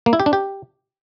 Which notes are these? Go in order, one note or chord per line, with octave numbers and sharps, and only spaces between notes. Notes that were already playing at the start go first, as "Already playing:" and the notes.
A#3
E4
G4
D4
G4